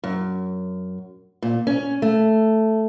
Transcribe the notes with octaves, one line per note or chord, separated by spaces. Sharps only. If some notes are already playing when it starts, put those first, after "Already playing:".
F#2
A#2
C#4
A3